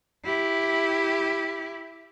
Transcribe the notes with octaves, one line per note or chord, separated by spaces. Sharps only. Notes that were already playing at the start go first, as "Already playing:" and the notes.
E4 G4